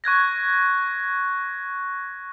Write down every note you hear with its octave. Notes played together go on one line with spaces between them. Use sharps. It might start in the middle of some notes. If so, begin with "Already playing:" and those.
C#6 F#6 G#6 A#6